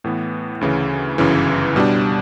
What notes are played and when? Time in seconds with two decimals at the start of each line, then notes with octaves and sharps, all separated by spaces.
0.04 A2 E3 B3
0.61 D2 C#3 E3
1.18 G1 F#2 C#3 E3
1.76 B2 G3 D4